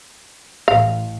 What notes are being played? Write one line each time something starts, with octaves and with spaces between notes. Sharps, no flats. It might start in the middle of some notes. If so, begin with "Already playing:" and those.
A1 F5